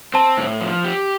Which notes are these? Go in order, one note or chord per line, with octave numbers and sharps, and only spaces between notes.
C4 A5
A2
F3
G4